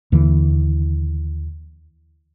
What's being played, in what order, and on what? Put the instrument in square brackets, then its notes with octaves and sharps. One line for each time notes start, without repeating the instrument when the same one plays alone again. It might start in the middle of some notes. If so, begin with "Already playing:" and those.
[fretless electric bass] D#2 D3 E3